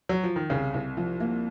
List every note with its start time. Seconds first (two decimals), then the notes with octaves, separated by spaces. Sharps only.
0.09 F#3
0.23 F3
0.36 D#3
0.50 C2 C#3
0.74 C2
0.97 F3
1.20 A#3